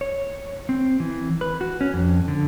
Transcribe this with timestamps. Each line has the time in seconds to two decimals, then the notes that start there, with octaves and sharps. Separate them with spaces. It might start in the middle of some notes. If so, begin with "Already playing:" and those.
0.01 C#5
0.69 C4
1.00 E3
1.41 B4
1.61 F#4
1.81 C#4
1.94 F2
2.28 D3